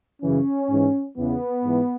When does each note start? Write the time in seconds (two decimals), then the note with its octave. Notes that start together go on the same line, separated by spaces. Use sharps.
0.21 F#2 C#3 E3 C#4
0.69 G#2 E3
1.16 E2 C#3 E3 B3
1.64 G#2 E3